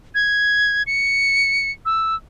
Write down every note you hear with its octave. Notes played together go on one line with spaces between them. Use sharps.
G#6
C#7
E6